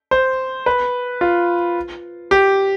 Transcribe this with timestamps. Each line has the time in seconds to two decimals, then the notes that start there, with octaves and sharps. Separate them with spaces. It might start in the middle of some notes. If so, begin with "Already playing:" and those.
0.11 C5
0.66 B4
1.21 F4
2.31 G4